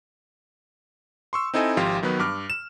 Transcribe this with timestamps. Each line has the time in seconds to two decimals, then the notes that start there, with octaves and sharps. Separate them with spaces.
1.33 C6 C#6 E6
1.54 C4 D#4 E4 A4 D#5 G#5
1.77 G#1 F3 F4 G4 F5 C6
2.03 D#3 F#3 B3 B4
2.19 G2 D6 F6
2.50 E7